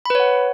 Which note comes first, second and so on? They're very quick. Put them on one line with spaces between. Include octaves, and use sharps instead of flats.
B5 B4 C#5 F#5